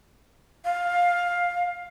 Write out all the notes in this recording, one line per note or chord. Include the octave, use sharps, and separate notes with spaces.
F5